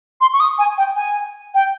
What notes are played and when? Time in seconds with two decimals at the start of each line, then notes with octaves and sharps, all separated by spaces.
0.21 C6
0.33 C#6
0.40 D#6
0.58 G#5
0.78 G5
0.96 G#5
1.54 G5